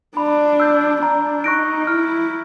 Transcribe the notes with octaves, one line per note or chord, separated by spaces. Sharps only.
D4 B5
E6 G6
D4 A#5
D#4 C#6 F#6 A#6 D7
E4 F6